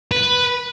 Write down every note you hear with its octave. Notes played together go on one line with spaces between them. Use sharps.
B4